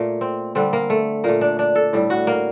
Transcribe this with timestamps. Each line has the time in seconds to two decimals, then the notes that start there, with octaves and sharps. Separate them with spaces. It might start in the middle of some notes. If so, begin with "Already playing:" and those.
Already playing: A#2 A3 A#3
0.21 C4
0.55 D3 G3 C4
0.73 A#3
0.90 A3
1.24 A#2 A3 A#3
1.41 D4
1.59 D4
1.75 A4
1.93 A2 G3
2.10 F#4
2.27 A#3